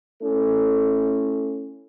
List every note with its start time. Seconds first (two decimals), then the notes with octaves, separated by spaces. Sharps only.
0.23 A3 C#4 E4 A4